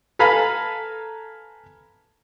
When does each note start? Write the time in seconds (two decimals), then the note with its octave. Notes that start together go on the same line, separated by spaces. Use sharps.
0.19 A4 B4 F5 G#5 A#5 B5